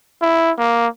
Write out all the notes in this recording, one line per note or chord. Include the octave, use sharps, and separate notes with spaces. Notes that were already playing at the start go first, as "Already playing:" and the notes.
E4
A#3